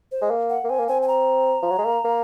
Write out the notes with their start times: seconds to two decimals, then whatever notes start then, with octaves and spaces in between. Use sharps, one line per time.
0.12 C5
0.21 G#3
0.30 A#3
0.50 F#5
0.64 A#3
0.69 C4 G#5
0.79 A#3
0.88 C4 G#5
1.02 G#5
1.08 A#5
1.62 F3
1.70 F#3
1.78 G#3
1.85 A#3
2.04 A#3